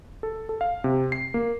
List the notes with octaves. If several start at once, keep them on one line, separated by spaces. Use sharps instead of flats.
A4
A4
F5
C3
C7
A#3